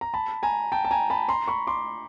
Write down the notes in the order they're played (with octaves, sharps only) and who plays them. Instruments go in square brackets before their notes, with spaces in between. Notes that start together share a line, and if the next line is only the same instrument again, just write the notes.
[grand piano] A#5
A5 B5
G#5 A#5
G5 A5
A5
G#5 A#5
A5 B5
A#5 C6
B5 C#6
C6 D6